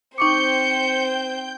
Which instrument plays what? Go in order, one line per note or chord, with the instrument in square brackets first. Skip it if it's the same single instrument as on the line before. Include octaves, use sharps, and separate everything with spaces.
[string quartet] C4 C5 [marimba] D#4 C#6 D6 [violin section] G5 G6 [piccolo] C#7